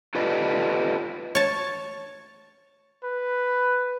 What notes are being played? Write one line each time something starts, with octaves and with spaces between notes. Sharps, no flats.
F4 G4 A4 B4 D5 D#5
C#5 A5
B4